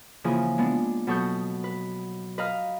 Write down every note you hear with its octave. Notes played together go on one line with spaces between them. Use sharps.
C#3 E3 F3 A#3 G#4
G#3 B3 D4
B2 F#3 A4 C#6 D#6 G6
B4
B4 D#5 F5 A#5 F6